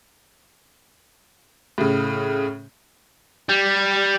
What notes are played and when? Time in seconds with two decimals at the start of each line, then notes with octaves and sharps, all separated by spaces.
1.78 A2 C#3
3.49 G3